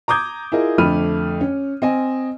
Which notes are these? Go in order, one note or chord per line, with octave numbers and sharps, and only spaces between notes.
A#5 D6 D#6 G6 G#6
E4 F4 G#4 A#4 D#5
F2 D3 A3 B5 F6 D#7
C#4
C4 D#5 G#5